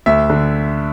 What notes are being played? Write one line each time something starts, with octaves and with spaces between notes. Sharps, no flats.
D2 E5
D3